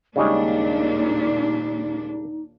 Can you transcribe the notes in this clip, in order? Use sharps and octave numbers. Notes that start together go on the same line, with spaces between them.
D#2 A#2 C#3 G3 G#3 D4 D#4